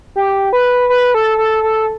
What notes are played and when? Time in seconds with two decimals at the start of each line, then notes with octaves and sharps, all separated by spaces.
0.16 G4
0.53 B4
0.90 B4
1.14 A4
1.38 A4
1.63 A4